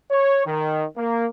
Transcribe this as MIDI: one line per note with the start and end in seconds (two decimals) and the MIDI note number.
0.11 0.44 73
0.46 0.85 51
0.97 1.27 58